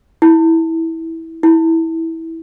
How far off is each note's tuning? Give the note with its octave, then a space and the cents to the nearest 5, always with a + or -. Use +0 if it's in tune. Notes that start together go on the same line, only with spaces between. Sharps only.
E4 -15
E4 -15